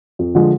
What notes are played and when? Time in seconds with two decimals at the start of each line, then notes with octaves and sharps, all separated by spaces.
0.19 F2
0.35 D3 F3 G#3